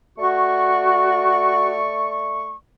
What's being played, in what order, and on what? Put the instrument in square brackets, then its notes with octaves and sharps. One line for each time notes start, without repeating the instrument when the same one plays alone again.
[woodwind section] A3 D5 C#6 [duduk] F#4